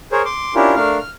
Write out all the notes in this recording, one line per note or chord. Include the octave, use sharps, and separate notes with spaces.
G#4 A#4 C5 C#5
C6 D6
C#4 D4 E4 F4 G4 A#4
A3 D4 A#4 F5 F6
F6